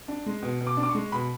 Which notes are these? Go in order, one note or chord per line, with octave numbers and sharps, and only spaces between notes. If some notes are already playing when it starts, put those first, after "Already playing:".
D4
G#3
B2
B2
D6
D4
D6
C#6
G#3
B2 B5